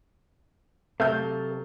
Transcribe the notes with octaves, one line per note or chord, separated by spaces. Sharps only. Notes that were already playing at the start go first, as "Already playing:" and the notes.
C3 F#3 A3 A4 F5 G6